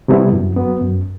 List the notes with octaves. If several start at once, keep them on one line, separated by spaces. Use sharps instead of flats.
C3 G3 B3 E4
F#2
F#3 B3
F#2